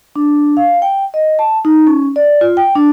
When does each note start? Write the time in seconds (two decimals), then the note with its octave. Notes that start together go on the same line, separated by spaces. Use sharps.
0.16 D4
0.57 F5
0.82 G5
1.14 D#5
1.39 A5
1.65 D#4
1.87 C#4
2.16 D5
2.41 F4
2.57 G5
2.75 D4